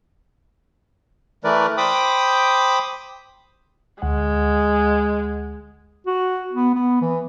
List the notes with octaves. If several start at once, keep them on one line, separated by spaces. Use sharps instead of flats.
E3 A3 A#4 B4 D5
C5 G5 B5 D6 D#6
D2 G#3 F#5
F#4
B3
B3
E3